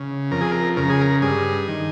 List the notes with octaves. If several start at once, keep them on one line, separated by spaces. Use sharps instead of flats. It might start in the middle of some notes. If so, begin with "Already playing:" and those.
Already playing: C#3
F2 A#4
G#4
A#4
C#3 A#4
G#4
A#4
G2 G#4
D#3